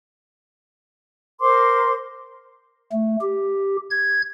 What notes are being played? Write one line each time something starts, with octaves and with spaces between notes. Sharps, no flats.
A#4 C5 C6 D6
A3
G4
G#6